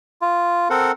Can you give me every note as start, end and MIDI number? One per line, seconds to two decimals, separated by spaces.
0.22 0.68 65
0.70 0.92 60
0.70 0.92 69
0.70 0.92 70
0.70 0.92 78